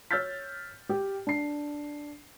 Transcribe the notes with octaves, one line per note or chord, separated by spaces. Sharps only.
C#5 E6 F6 G6 A6 B6
G4
D4 C7